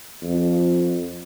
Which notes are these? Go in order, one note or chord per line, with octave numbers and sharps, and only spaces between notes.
F2